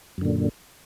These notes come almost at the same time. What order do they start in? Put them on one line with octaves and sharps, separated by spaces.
F#2 D3 A#2